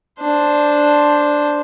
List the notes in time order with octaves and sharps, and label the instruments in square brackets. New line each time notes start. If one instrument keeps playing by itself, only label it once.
[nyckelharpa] D4 C5